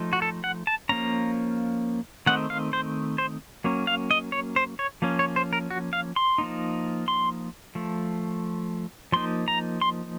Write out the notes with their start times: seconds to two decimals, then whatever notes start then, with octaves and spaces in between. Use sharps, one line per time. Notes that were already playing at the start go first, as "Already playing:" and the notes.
Already playing: F3 A3 D#4
0.13 F#4
0.22 A4
0.44 F#5
0.67 A5
0.89 F3 A#3 C#4 A#5
2.26 D#3 A3 C4 D#4 F#5
2.50 F5
2.73 C5
3.18 C5
3.64 F#3 A#3 C#4
3.87 F5
4.11 D#5
4.32 C#5
4.56 C5
4.79 C#5
5.02 F3 A#3 C#4
5.19 C#5
5.36 C5
5.53 A#4
5.70 F#4
5.93 F5
6.16 C6
6.38 F3 A#3 D#4
7.08 C6
7.75 F3 A3
9.12 F3 A#3 D#4 C6
9.48 A#5
9.81 C6